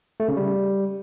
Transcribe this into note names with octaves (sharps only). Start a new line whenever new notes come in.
A3
C#3
G3